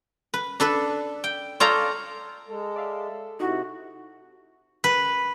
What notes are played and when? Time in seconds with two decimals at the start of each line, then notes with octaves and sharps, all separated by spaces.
0.34 B4
0.60 D4 A4 B4
1.24 G5
1.60 F4 A4 C#5 D5 G5 A#5
2.48 G#3 A4
2.76 D5 E5 F5
3.40 C3 D#4 E4 F#4
4.84 B4